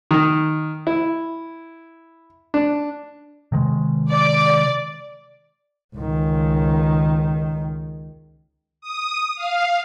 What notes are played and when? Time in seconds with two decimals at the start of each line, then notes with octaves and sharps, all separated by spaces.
0.11 D#3
0.87 E4
2.54 D4
3.52 C3 D#3 G#3
4.09 D5
5.96 C#2 D#3
8.81 D#6
9.36 F5